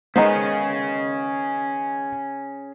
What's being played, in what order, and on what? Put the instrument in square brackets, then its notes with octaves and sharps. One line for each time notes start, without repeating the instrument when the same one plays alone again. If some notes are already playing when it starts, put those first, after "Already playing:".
[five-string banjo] D#3 B3 C5 [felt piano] G#3 D#5 [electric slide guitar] C#4 G#4